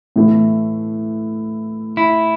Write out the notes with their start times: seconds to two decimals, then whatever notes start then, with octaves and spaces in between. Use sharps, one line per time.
0.16 A2 E3 A3
1.97 E4